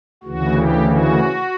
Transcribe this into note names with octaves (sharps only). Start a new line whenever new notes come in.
D2 C#3 E3 F#4
G4
F#4